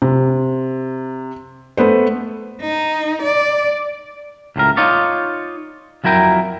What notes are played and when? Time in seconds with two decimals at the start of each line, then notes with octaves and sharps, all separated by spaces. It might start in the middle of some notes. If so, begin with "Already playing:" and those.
0.02 C3
1.77 A3 B3 B4 C5
2.61 D#4
3.22 D5
4.56 C#2 A2 A#4
4.77 D#4 F4 C#5 D5
6.04 F2 F#3 E4 A#4 G5